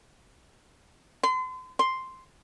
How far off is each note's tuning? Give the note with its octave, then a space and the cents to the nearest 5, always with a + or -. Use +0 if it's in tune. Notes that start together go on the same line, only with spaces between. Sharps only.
C6 -40
C6 +0